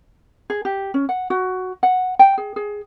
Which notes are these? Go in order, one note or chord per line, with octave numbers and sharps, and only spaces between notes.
G#4
G4
C#4
F#5
F#4
F#5
G5
G#4
G#4